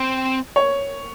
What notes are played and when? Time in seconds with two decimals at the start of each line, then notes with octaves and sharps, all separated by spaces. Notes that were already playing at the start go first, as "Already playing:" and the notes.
Already playing: C4
0.56 C#5